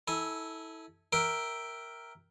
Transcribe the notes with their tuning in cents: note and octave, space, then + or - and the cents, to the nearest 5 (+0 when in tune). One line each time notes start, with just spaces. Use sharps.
E4 -25 A4 +0 G#5 -5
A#4 +0 E5 +0 G5 +0